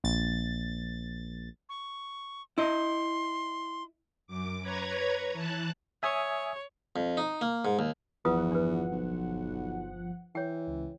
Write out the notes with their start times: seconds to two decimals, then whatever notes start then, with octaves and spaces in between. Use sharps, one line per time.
0.04 A#1 A6
1.69 C#6
2.58 E4 D#5 C6
4.27 F#2 D6
4.62 B4 C#5 A#5 G#6
5.33 E3 A5 F#6
6.03 C#5 E5 G#5 D#6
6.96 F2
7.17 D#4
7.41 A#3
7.65 G#2
7.79 D#2
8.25 G1 E2 F3 F4 B4 F#5 D#6
8.51 D4 B4
8.92 B1
10.35 E3 C#5 G5
10.67 C#2